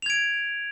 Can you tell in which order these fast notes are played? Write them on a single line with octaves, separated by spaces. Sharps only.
F7 G#6 D7